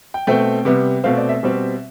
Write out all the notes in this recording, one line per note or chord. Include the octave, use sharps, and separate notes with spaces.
G5
B2 A3 C4 G5
C3 G3 B3
B2 A3 C4 F5
D5
E5
B2 G3 C4